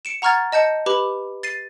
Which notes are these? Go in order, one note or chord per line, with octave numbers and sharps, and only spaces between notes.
C#7 D7 E7
F#5 A#5 C#6 F6 G#6 A6
D#5 A5 G6 C#7
G4 B4 B5 D6 F#7
A6 C7 D#7